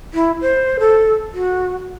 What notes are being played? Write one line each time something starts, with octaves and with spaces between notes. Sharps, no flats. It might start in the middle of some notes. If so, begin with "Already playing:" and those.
E4
C5
A4
F#4